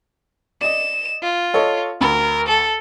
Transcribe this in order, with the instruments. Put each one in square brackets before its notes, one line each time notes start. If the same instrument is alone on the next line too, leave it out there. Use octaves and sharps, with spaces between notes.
[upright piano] D5 D#5 [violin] E7
[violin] F4
[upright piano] A4 C#5 D#5
[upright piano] D2 B5 [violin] A#4
[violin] A4